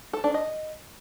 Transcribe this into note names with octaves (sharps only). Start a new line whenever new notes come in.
A4
D4
D#5